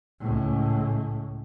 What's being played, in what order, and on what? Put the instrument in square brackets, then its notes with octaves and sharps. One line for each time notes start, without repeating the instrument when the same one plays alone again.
[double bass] C#2 A2